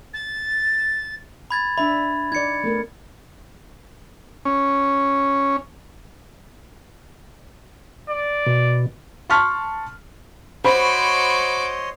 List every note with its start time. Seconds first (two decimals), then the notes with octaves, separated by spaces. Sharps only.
0.14 A6
1.51 B5 G#6 A6
1.78 D4 E5 B5
2.32 D#4 D5 G#6 C#7
2.64 A3 B3 A#4
4.45 C#4
8.10 D5
8.46 B2
9.30 A5 C6 C#6 F6 F#6 B6
10.65 F#4 C5 C#5 D#5 B5 C6 D6